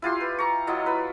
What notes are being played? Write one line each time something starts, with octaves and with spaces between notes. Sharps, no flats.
E4 F4 G4 C6
B4
A#5 C#6
F#3 E4 F4 D#5
B4 B5